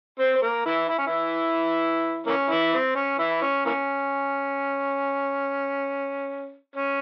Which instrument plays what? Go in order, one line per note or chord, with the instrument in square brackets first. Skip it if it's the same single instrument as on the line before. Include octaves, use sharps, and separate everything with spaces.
[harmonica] C4 C5
C5
A#3 A#4
E3 E4
E4
C#4
E3 E4
E3 A#3 C#4
E3 E4
C4
C#4
E3 E4
C#4
E3 A#3 C#4
C#4